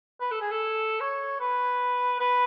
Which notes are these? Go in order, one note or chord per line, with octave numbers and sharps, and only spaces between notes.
B4
A4
G#4
A4
C#5
B4
B4